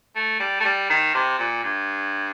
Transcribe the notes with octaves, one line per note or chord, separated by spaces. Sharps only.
A3
G3
A3
G3
D#3
C3
A#2
G2